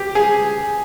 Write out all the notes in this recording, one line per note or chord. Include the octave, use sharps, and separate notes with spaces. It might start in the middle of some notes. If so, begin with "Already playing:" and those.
Already playing: G4
G#4